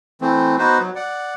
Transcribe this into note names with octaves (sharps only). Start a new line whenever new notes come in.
E3 A3 C4
B3 D#4 F#4 B4 C5
F#3
D5 F#5